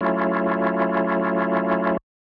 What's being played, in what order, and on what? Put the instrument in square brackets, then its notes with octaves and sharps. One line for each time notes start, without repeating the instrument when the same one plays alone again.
[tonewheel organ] F#3 A3 C#4 E4 F4